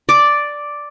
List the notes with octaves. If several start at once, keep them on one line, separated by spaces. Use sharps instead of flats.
D5